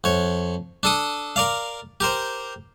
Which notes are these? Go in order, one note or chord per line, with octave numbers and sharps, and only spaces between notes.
F2 C#5
D4 A4 D#6
A#4 D5 F5
G4 A#4 C5